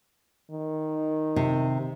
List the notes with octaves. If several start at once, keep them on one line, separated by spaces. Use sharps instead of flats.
D#3
C3